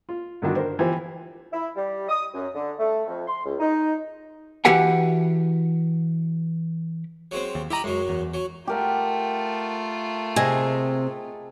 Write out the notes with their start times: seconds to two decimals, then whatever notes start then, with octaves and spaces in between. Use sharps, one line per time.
0.09 F4
0.42 G2 D3 D#3 D4 F#4
0.56 D4 A#4 C5
0.79 E3 F3 F4 G4 C5
1.53 E4
1.76 G3
2.09 D#6
2.34 F#2
2.55 D3
2.79 A3
3.08 F2
3.28 C6
3.45 C#2
3.60 D#4
4.65 E3 F#4 G4 F#5 G#5
7.31 F#3 G#3 C4
7.55 D#2
7.70 E4 G4 D#5 A#5 B5
7.84 F#2 F#3 G#3
8.09 E2
8.34 F#3
8.67 A3 F4 G4 A#4 F#5
10.36 C3 G#4 D#5 G#5